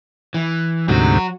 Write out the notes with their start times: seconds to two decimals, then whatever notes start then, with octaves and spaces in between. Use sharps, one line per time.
0.34 E3
0.89 D2 G#2 C3 F#3 F#4